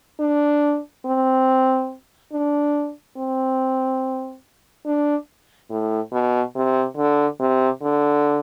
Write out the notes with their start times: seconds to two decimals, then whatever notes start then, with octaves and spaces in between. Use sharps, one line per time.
0.20 D4
1.06 C4
2.32 D4
3.17 C4
4.86 D4
5.71 A2
6.12 B2
6.56 C3
6.97 D3
7.40 C3
7.83 D3